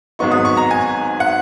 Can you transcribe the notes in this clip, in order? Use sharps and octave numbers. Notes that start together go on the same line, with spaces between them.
G#1 G#2 F#3 B3 D#4 C#6
D#6
C#6
A#5
G#5
F#5